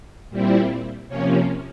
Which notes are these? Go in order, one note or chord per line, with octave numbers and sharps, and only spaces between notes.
A#2 G3 C4 E4
C3 F3 A#3 C#4 C#5